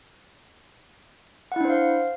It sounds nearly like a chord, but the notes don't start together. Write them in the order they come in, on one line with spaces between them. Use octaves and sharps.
F#5 E4 D4 C5 F5